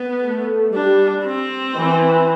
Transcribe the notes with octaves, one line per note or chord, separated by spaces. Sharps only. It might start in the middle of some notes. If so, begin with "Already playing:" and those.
Already playing: B3
A3
G3 D4
C4
E3